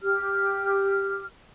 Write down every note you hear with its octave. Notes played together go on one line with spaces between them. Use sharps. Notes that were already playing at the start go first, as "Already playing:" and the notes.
G4 F6